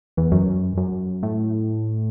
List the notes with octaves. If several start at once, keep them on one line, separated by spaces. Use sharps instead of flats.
E2
F#2
F#2
A2